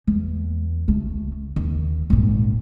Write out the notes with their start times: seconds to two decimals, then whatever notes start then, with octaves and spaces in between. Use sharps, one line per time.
0.07 E2
0.88 C#2 A3
1.56 D#2
2.10 G#1 A#2